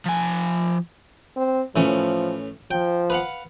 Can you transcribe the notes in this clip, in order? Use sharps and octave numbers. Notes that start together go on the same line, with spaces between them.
F3 G#5
C4
A2 E3 F3 C#4
F3 G5
B4 F5 F#5